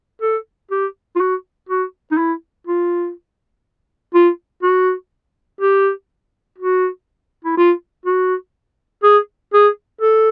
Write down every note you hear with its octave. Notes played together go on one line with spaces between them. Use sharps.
A4
G4
F4
F#4
F#4
D#4
E4
F4
F4
F#4
G4
F#4
E4
F4
F#4
G#4
G#4
A4